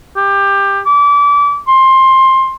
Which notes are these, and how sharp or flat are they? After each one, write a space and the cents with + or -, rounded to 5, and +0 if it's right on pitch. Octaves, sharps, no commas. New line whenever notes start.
G4 +20
D6 -30
C6 +15